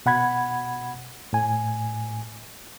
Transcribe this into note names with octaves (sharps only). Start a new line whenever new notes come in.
B2 F#5 B5 G#6
A2 G#5